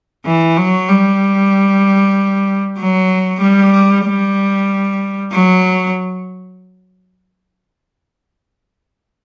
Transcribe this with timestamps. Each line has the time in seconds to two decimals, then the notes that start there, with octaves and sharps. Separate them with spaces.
0.26 E3
0.57 F#3
0.89 G3
2.79 F#3
3.41 G3
4.05 G3
5.32 F#3